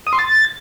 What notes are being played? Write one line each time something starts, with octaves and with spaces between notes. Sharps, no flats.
D#6
C6
A6